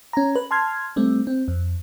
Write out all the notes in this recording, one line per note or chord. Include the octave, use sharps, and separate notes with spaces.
C#4 A#5
B4
A5 C6 F6 G#6
G3 A3 C4
C4
F2